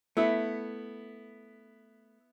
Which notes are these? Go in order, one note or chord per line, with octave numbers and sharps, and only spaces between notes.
A3 B3 E4